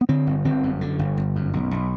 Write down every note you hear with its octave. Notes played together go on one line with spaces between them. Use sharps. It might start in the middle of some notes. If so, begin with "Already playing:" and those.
B3
D3 C4
G1
G1 C4
F#2
D3
G1
G1
F#2
B1
B1